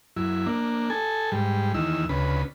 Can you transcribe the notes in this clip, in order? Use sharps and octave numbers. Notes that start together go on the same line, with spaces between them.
F#2 E4
A#3 D4
A4 G#5
G#2 G3
E2 D#3 E6
D2 C#3 B4